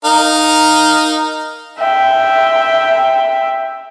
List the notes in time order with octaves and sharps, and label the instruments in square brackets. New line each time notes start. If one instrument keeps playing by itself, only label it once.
[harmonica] D#4 A#4 F5
[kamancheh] E5 G5